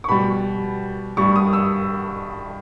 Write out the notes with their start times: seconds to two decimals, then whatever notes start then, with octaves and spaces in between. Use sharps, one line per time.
0.04 C#6
0.08 B2 G3 B5
1.17 G2 G3 C#6
1.36 D#6
1.53 E6